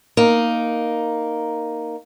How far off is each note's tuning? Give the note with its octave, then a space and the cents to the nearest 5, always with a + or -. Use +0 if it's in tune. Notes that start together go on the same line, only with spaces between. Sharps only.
A#3 +0 D#4 +0